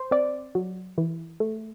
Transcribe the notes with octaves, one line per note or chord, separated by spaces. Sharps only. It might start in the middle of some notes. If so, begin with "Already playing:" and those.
Already playing: C5
C4 D5
F#3
E3
A3